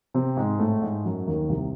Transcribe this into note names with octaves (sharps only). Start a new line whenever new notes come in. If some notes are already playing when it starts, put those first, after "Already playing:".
C3 C4
G#2 G#3
A2 A3
G#2 G#3
F#2 F#3
D#2 D#3
C2 C3